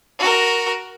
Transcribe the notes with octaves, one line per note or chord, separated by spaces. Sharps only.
F#4 A#4